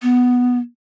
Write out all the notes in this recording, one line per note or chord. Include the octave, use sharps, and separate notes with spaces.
B3